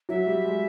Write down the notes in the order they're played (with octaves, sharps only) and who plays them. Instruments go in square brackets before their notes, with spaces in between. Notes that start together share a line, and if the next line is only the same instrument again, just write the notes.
[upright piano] F#3 [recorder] E5
[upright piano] G3
G#3